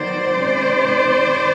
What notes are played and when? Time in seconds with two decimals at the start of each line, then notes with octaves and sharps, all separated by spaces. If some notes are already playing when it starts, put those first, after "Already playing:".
Already playing: D#3 F#3 B3 C5 D5
0.33 C3 D#3 G#3 C#4
1.22 D#3